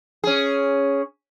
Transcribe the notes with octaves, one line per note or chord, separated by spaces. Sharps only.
C#4 G#4